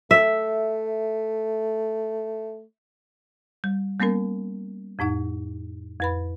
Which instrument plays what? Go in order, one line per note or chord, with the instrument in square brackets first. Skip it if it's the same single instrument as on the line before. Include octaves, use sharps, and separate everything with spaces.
[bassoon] A3 [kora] E5
[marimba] G3
G3 A#3 B3 C#4 A#4
F2 A2 D#4 F#5
F2 B4 B5